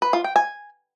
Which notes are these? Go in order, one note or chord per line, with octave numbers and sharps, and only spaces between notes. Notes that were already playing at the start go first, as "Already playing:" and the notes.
B4
F4
G5
G#5